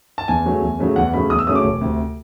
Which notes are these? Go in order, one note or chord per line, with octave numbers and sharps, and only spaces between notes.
A5
E2 G#5
C#3 F#3 A3 C#4
E2
C#3 F#3 A3 C#4
E2 F#5
C#3 F#3 A3 C#4 B5
E2 D#6
E6
C#3 F#3 A3 C#4 D#6
D6
E1
D2 C3